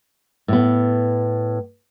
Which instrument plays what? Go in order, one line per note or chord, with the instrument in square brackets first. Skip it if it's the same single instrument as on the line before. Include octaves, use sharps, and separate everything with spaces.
[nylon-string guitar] A2 B3